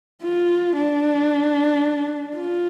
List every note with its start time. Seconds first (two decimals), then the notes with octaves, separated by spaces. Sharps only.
0.23 F4
0.76 D4
2.36 F4